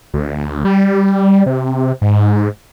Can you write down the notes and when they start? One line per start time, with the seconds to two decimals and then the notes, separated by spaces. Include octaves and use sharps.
0.14 D2
0.65 G3
1.46 C3
2.02 G#2